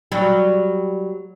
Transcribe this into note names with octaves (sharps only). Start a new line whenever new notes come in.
F#3 G3